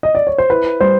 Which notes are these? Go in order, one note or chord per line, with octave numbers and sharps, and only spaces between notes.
D#5
D5
C#5
C5
E4 B4
G3 C5